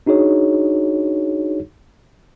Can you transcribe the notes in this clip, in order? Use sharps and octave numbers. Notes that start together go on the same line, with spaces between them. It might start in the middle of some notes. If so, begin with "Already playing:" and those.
D4 D#4 F#4 G#4 C#5